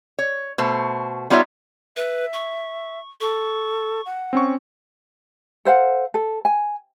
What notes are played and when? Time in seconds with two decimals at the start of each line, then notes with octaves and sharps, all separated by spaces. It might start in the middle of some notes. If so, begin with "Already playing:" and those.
0.19 C#5
0.58 B2 A3 C5
1.30 G3 B3 D#4 F4 C#5 E5
1.97 B4 E5
2.33 C#6
3.21 A4 C#6
4.06 F#5
4.33 C4 C#4 C#6
5.65 A4 C5 F5 F#5
6.14 A4
6.45 G#5